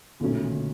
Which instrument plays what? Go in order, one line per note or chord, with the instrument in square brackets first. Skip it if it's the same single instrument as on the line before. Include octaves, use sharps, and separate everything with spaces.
[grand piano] B1 A#2 F#3 A3 C#4 [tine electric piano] D3
[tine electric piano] D#3
D3